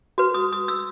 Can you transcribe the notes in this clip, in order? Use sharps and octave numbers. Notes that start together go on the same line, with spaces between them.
F#4 B4
D#6
D#6
E6